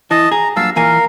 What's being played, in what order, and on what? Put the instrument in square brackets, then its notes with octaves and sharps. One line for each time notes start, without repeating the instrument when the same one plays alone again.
[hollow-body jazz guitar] E3 [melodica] D#5 A5
[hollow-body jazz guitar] G#4 [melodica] A#5
[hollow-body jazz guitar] G2 A#2 F#3 [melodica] F5 A5 E6
[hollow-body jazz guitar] A#2 E3 G#5 [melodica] A#4 F5